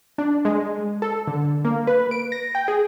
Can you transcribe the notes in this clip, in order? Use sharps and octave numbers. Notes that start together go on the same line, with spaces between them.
D4
G#3
A4
D3
A#3
B4
D7
A#6
G5
G#4